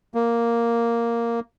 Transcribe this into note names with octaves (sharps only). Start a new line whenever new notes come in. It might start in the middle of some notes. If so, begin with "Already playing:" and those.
A#3